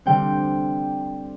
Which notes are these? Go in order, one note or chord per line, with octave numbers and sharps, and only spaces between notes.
D3 G3 C4 G5